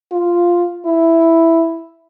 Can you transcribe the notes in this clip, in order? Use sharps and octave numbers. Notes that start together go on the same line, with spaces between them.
F4
E4